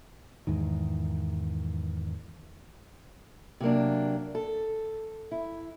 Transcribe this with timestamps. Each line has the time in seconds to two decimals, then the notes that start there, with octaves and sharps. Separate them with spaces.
0.47 E2 G#2 D#3
3.60 C3 F#3 A#3 D4
4.35 A4
5.31 E4